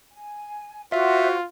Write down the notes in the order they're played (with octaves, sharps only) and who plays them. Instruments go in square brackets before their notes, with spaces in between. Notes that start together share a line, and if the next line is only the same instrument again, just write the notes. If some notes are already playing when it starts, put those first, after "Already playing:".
[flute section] G#5
[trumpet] F4 [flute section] F#4 C5 [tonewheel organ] E5